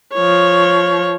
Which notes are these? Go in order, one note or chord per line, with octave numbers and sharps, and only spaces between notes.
F3 C#5